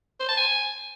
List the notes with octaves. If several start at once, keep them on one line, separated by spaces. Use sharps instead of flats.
C5
A5
G#5